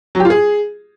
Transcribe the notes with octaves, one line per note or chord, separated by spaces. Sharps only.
F#3
G4
F4
G#4